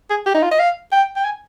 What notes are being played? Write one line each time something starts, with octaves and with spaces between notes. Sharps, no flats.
G#4
G4
D#4
F4
D#5
F5
G5
G5
G#5